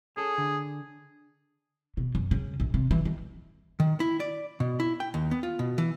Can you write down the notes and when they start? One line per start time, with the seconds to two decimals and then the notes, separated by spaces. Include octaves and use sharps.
0.17 C#4 G#4 A4
0.38 D3
1.97 B2
2.15 F#2
2.31 C#3
2.60 A#1
2.74 C3
2.91 E3
3.05 D#3
3.80 D#3
4.00 E4
4.20 D5
4.60 B2
4.80 E4
5.00 G5
5.14 D#2
5.31 B3
5.43 F4
5.59 B2
5.78 E3